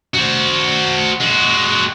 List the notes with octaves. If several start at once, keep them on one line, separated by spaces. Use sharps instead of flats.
F#4 C5
G#3 F#4